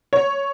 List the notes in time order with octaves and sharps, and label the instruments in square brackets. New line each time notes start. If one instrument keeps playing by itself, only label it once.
[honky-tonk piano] C#5